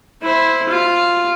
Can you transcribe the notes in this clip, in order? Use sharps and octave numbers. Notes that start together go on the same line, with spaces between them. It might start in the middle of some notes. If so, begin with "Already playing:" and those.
E4 C5
F4